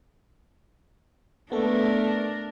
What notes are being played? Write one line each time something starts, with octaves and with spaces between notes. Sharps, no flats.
A3 B3 D4 A4 A#4